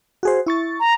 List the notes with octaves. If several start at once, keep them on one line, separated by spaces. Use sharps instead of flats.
F#4 G#4 C5
E4 C#6 A6
A#5